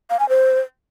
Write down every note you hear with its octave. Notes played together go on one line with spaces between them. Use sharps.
F5
G#5
C5